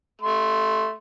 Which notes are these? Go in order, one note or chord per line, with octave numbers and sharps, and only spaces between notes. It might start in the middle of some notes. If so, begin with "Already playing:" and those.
A3 C6